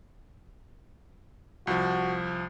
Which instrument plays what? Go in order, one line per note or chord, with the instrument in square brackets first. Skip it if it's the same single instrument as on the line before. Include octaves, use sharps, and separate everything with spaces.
[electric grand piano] C2 F3 [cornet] F#4